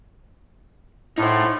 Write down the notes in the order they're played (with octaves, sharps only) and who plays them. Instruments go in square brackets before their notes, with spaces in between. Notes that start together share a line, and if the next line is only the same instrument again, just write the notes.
[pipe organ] A2 [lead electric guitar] D#4 C5